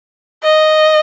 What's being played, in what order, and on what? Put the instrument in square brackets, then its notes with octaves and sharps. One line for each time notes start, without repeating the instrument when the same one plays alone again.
[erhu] D#5